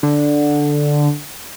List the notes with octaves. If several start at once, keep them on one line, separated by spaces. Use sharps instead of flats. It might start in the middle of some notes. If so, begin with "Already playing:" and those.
D3